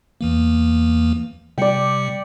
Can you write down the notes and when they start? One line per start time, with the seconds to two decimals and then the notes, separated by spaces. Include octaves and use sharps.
0.21 E2 E3 A#3
1.58 C3 G3 D5 G5 C#7